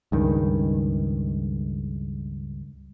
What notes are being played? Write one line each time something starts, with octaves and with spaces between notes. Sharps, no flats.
C#2 G2 D#3